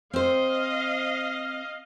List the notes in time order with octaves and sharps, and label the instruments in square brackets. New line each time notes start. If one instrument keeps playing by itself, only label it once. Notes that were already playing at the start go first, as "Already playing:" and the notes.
[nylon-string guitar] C4 C5 [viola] D#5 F5